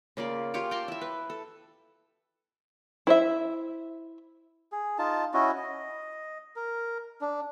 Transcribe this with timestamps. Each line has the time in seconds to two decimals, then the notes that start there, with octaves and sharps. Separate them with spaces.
0.17 C#3 A#3 F4 D5
0.54 F4 G4 C#5 D6
0.71 G5 A5 A#5 C6
0.88 E4 E5
1.01 B4
1.30 A4
3.07 E4 C5 E5
4.72 G#4
4.98 D#4 F4 A5
5.34 C#4 E4 F#4 D#5
5.58 D#5
6.56 A#4
7.21 D4